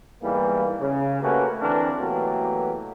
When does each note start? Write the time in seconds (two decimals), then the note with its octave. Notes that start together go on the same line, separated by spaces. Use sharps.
0.22 E2 G#2 E3 G3 A#3
0.80 C#3
1.22 A3 A#3 C#4 F#4 G4 B4
1.60 D3 E3 C4 D4 A#4
1.99 B2 E3 F#3 A3 A#3 G4